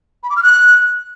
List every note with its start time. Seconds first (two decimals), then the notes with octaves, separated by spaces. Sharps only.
0.23 B5
0.30 D6
0.36 F6
0.43 F#6